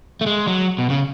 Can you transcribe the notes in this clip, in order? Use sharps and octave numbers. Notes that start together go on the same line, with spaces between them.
A3
G#3
F#3
B2
C#3